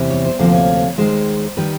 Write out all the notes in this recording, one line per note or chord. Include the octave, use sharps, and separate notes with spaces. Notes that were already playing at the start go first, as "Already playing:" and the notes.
Already playing: E2 C3 E3 G3
C#5
C5
D2 C3 F3 A#3 C5
C#5
D#2 D#3 G#3 C5
D#3 G3 B4